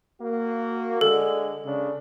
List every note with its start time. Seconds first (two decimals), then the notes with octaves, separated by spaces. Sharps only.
0.22 A#3 F#4
1.01 D3 G#3 A4
1.65 C#3 D4